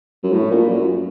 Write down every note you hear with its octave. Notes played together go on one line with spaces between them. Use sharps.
F#2
A2
A#2
F#2